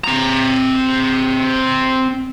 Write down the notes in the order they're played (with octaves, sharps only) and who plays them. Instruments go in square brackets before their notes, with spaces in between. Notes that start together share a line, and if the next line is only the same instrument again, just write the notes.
[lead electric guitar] C4 A#5